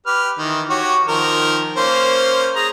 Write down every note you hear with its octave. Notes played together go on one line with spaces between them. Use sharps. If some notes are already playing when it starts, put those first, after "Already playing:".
G4 B4 F6
D#3 E3
F#4 G4 C#5
D#3 F3 A#4
A#3 C#4 C5
G#4 A#5